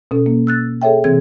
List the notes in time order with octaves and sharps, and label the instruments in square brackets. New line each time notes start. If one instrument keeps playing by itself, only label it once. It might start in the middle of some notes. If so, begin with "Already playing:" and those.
[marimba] B2 C#4 A4
A#3
E6 F#6 A6
G#4 A4 C#5 E5 G5
C3 E3 C4 G#4 G#6